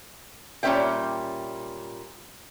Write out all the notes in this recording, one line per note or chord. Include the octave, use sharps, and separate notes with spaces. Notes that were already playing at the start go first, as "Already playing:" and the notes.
A#2 G3 C#4 B4 E5 G5